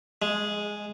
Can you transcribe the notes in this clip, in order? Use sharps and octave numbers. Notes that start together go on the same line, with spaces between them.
G#3